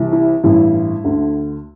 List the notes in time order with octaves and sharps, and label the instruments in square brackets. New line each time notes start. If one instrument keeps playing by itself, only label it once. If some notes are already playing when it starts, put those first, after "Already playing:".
Already playing: [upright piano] C2 C3 E3
E4
A1 G2 E3 E4
D2 D3